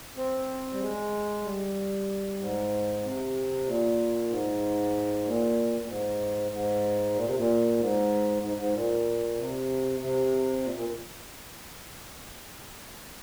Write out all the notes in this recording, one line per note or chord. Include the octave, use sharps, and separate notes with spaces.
C4
G3
G#3
G3
G#2
C3
A#2
G#2
A#2
A#2
G#2
G#2
A#2
C3
A#2
G#2
G#2
G#2
A#2
C3
C3
A#2
A#2